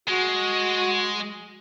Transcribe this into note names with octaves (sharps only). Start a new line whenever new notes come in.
G#3 F#4